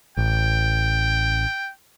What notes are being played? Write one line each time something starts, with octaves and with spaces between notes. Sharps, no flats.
A1 G5